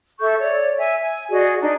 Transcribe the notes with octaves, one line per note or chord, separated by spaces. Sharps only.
A4 E5 C#6 G6
C#5 D5
E5 G#5
G#5
F#4 G#4 D5 D#5
D4 D#4